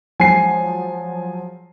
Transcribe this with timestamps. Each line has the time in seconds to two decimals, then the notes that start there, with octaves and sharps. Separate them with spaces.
0.20 F3 F#3 G#3 G#5 C7